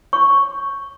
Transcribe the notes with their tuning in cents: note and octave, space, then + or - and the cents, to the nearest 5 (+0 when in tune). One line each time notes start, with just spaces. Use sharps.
C#5 +0 C#6 +0